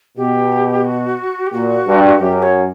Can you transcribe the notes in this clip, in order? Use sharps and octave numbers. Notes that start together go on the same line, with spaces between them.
B2 G4
F#4
G4
A#2 F#4
G2
F#2 G4
C#5